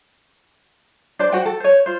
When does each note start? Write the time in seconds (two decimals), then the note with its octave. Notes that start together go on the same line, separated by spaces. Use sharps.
1.19 D4 G4 C5 D5
1.32 F#4 C5 F#5 G5
1.45 A4
1.60 C5 C#5
1.86 F4 C5